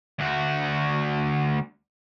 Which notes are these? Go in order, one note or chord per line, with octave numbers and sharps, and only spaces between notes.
D2 F#4